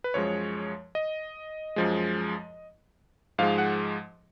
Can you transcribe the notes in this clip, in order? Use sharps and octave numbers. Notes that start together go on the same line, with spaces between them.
B4
F#2 F3 G#3 C#5
D#5
F#2 F3 G#3
G#2 F3 G#3 F5
F#5